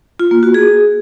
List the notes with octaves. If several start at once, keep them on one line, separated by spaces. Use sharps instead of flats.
F4
A#3
F#4
G#4